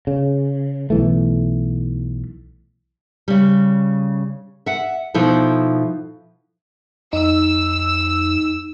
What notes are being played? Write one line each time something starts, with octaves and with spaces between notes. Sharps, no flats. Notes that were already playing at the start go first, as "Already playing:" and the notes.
C#3
B1 E3 A3
C#3 G3
E5 F#5
B2 F3 D#4 E4 A4
F2 D#4 E6